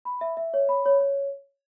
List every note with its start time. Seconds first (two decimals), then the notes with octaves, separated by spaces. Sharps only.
0.05 B5
0.21 E5
0.37 E5
0.54 C#5
0.69 B5
0.86 C#5
1.00 C#5